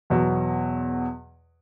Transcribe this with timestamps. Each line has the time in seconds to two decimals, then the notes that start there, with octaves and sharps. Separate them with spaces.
0.10 E2 B2 F#3